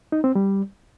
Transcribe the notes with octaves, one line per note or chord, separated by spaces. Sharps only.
D#4
C4
G3